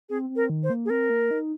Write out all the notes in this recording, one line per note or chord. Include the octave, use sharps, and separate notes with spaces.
C4 G#4
C4
A#4
D#3
C5
A#3
G#4
C4 A#4
A#3
D#4